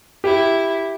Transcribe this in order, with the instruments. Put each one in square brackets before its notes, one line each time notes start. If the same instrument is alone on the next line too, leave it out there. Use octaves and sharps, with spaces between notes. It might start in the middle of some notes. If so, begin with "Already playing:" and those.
[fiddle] E4 [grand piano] G4